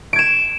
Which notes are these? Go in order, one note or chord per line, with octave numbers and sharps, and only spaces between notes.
G#6 D7 E7